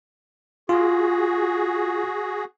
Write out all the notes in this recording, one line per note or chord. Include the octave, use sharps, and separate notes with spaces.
F4 F#4 G#4